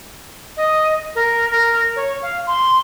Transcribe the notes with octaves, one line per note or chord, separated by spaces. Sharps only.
D#5
A#4
A#4
C#5
F5
C6